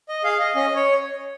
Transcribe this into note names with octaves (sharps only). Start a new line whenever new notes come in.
D#5
G#4 F5
D#5
C#4 D#5
C#5